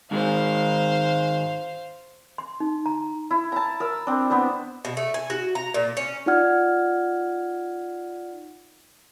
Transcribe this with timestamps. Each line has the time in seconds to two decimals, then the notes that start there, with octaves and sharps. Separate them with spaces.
0.11 G#2 D#3 G#3 C5 F5
2.38 C6
2.60 D#4
2.86 A#5
3.31 E4
3.52 A5 A#5
3.80 A#4 E6
4.07 C4 D4
4.30 B3 D4 C5
4.85 B2
4.97 A3
5.14 G#5
5.30 F#4
5.55 A#5
5.74 A#2
5.97 C#4
6.26 D#4 F4 D5 F#5 F6 G#6